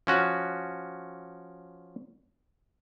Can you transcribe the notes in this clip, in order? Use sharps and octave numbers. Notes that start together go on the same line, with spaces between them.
F3 C#4 F#4